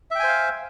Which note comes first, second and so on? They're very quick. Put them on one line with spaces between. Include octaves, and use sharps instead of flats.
E5 G5 G#5 C5 F5